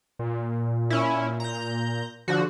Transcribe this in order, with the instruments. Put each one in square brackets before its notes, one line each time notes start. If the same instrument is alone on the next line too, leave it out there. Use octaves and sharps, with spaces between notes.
[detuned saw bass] A#2
[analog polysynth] C#4 E4
A#5 G6
[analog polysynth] D3 F#4 [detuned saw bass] F3